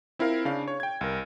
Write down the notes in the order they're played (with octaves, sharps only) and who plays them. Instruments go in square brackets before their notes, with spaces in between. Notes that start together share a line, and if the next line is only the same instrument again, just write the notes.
[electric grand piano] C4 E4 F4 A#4 F5
C#3 D4 F5
C#5
G5 G#6
C2 A#4